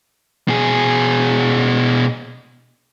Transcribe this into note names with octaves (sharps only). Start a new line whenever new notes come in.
B2 G#4